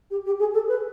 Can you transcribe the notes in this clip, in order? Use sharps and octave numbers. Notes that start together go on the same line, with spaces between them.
G4
G4
G#4
A4
B4